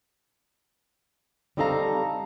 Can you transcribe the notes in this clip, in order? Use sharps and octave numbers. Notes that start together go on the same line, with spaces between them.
G3 C4 D#4 A4 F5 A#5